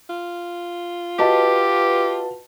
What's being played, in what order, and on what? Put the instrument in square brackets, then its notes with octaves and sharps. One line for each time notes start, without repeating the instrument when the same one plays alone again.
[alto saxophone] F4
[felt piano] F#4 D#5 A5 [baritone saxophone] G4 [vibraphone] B4